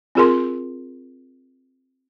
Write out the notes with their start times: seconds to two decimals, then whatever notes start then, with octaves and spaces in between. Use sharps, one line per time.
0.15 C4 F4 G#4 A#4 C6